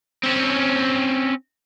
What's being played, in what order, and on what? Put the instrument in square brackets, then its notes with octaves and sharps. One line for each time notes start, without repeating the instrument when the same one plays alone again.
[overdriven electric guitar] C4 C#4